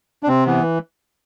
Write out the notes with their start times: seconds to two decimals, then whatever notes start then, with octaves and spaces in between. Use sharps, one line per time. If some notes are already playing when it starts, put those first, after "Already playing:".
0.23 D4
0.28 C3 C4
0.46 E3 B3